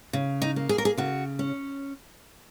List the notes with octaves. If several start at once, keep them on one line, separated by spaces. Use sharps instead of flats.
C#3
D#4
A#3
G#4
A#4
G#4
C#3 F#4
C#4